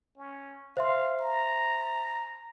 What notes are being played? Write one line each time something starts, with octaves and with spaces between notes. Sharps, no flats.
C#4
C5 E5 F5 C6
A#5